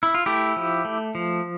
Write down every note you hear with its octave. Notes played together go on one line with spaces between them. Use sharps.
E4
F4
A3 E4 G4
F3
A3
F3